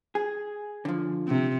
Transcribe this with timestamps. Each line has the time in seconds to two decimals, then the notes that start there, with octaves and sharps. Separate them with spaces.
0.15 G#4
0.85 D3 F3
1.28 C3